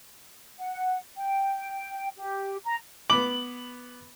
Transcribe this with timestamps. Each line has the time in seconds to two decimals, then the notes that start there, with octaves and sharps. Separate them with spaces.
0.59 F#5
1.17 G5
2.18 G4
2.64 A#5
3.10 B3 B5 D6 F#7